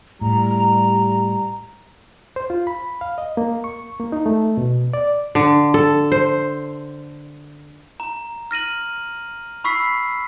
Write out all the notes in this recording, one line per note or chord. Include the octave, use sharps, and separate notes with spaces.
A2 G3 A#5
C5
F4
B5
F5
D#5
A#3
C#6
A#3
D#4
A3
B2
D5
D3
A4
C5
A#5
F6 A#6 D#7 F#7
B5 C#6 E6 B6 C7